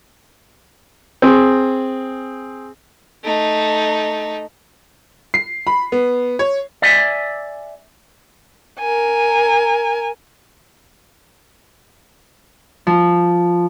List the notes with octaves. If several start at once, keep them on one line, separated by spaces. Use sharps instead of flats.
C4 G#4
A3 D#4
C7
B5
B3
C#5
D5 E5 G#5
A#4 G#5
F3